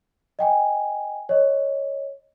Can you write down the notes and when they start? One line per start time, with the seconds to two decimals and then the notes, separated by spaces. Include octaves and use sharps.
0.39 D#5 G5 G#5
1.29 C#5 D#5